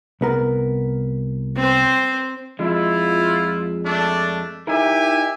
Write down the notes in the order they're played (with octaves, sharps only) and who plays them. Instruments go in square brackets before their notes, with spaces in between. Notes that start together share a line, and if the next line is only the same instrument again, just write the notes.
[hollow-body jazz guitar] C2 B3 A#4
[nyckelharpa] C4 C5
[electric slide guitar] F2 F3 G#3 [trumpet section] E4 F4
[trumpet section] A3 D4
[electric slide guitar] D#4 E4 A#4 [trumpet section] G4 E5 G#5